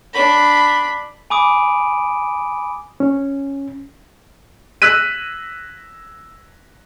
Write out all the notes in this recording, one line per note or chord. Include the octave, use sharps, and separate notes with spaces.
D4 B5
G#5 B5 D6 D#6 D7 D#7
C#4
E6 F#6 B6 D#7